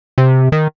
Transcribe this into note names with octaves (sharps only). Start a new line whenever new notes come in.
C3
D#3